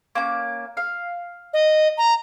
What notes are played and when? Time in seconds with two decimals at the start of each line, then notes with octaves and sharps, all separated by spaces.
0.15 A#3 C#4 D6
0.77 F5
1.53 D#5
1.98 A#5